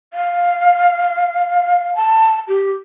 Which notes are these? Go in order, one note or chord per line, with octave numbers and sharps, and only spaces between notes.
F5
A5
G4